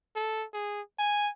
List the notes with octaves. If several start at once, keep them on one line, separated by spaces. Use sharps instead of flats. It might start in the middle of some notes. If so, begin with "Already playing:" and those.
A4
G#4
G#5